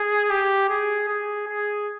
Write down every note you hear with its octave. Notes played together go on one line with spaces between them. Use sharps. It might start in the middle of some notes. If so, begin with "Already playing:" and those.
Already playing: G#4
G4
G#4
G#4
G#4